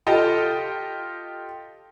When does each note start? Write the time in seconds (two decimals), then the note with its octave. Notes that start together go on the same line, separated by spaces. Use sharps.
0.07 F4 G4 A4 D#5